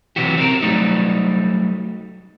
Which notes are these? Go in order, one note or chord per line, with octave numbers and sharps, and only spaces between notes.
C3 E3 F#3 F#4 G4
C4 G4 A#4
F#3 G3 A3 D#4